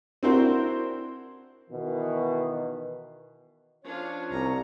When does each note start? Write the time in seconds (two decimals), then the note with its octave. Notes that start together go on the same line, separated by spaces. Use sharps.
0.23 C4 D4 E4 F#4 A#4 C5
1.71 B2 D#3 E3 F#4
3.84 F3 C#4 D4 F4 C#5
4.31 C2 A#5